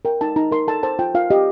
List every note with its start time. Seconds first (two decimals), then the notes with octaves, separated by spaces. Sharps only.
0.05 A#4 G5
0.21 D#4 A5
0.36 D#4 A#5
0.51 A#4 C6
0.67 A4 A5
0.83 C5 A5
0.99 F4 G5
1.15 F4 F5
1.30 G4 D#5